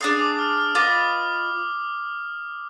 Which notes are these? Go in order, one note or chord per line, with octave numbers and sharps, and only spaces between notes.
D4 G#4 D5 F5 D#6
D6
F6
F6
F4 B4 D#5 D6